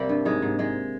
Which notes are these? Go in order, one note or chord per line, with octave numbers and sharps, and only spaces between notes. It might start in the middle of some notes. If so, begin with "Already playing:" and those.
Already playing: C3 G3 A#3 C4
G2
G#2 G#3
G#2
G#2 G#3